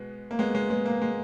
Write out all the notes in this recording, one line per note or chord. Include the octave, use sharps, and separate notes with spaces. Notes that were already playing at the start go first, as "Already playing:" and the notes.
Already playing: B2 G#3 B3
A#3
G#3 B3
G#3 B3
G#3 B3
A#3
G#3